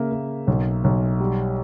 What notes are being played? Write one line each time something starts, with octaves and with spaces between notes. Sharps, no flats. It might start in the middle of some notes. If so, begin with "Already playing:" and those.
Already playing: C#3 A#3 E5
A#3
B1
B1
G3